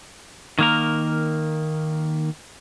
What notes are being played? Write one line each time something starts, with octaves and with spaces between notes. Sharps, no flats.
D#3 A#3 A#4